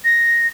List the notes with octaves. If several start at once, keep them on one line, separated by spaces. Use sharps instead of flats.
A#6